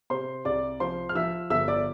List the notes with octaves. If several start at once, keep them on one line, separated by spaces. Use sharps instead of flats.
C3 C5 C6
C2 D5 D6
F3 C5 C6
F6
F3 E5 E6
G1 E5 E6
D5 D6